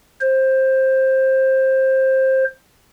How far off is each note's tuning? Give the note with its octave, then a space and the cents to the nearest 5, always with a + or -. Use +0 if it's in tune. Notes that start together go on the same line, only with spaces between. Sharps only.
C5 +15